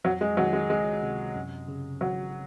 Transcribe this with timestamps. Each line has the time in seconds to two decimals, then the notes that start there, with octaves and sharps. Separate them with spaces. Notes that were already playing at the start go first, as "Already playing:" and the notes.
0.04 F2 F#3
0.21 G#3
0.37 D#3 F#3
0.53 G#3
0.70 C#2 G#3
1.03 C3
1.35 F#2
1.68 C#3
2.01 G#1 F#3